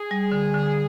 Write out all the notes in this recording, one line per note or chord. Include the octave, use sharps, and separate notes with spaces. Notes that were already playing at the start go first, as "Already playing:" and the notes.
Already playing: G#4
G3
D3
D3